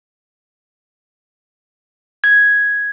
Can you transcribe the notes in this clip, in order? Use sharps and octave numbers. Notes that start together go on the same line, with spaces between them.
G#6